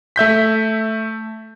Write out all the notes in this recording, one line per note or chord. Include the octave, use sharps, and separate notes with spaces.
A3 E5 G6 B6